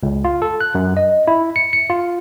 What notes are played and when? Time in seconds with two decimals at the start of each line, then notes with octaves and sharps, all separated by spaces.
0.03 C#2
0.25 F4
0.42 A4
0.61 F#6
0.75 F#2
0.97 D#5
1.27 E4
1.56 C#7
1.73 C#7
1.90 F4